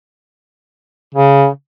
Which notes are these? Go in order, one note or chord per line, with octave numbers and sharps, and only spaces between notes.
C#3